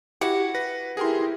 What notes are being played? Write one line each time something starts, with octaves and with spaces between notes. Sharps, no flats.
E4 F#4 G4 F#5
B4 A#6
E4 G4 G#4 A#4 C6